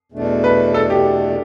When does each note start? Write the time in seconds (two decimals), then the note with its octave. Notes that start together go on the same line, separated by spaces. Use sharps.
0.12 E2 B2 A3 D4
0.44 B4
0.74 A4
0.90 G4